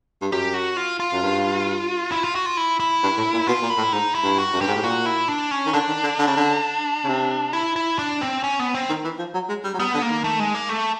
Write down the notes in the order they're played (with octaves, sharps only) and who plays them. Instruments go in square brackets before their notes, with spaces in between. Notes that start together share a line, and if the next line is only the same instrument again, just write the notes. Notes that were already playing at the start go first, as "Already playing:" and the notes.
[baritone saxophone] G2
[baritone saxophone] F#2 [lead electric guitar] G4
[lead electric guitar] F#4
F4
F4
[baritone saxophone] F#2
G2
[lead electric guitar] E4
F4
F#4
F4
E4
E4
[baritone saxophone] G2
A2
A#2
[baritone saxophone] B2 [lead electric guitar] F4
[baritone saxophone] A#2
[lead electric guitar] E4
[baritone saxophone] A2
[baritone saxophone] G#2 [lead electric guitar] D#4
[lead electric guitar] E4
[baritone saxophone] G2
[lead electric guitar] F#4
[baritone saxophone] F#2
[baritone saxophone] G2 [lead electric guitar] G4
[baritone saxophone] G#2
A2
[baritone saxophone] A#2 [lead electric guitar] F#4
[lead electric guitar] E4
D4
C#4
[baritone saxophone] D#3
[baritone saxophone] D3 [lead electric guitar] D4
[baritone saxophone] D#3
D3
D3
C#3
D3
C#3
C3
[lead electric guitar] E4
E4
D4
C4
C#4
B3
C4
[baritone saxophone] D#3
E3
F3
F#3
G#3
G3
F#3
[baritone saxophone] G3 [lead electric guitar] B3
[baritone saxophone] D3
[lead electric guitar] A#3
[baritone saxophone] D#3
[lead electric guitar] A3
G#3
A#3
A3